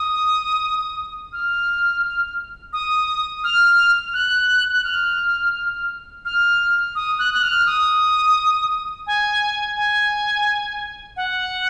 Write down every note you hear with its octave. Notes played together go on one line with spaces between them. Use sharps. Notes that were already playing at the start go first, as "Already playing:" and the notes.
Already playing: D#6
F6
D#6
F6
F#6
F#6
F6
F6
D#6
F#6
F#6
F6
D#6
G#5
G#5
F#5